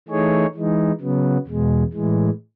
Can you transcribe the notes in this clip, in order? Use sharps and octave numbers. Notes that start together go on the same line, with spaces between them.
E3 A3 D#4 G#4 C#5
E3 G#3 D#4
C#3 F#3 B3
E2 B2 G#3
A2 E3 G#3